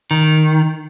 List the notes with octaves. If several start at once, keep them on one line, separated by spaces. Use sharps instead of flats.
D#3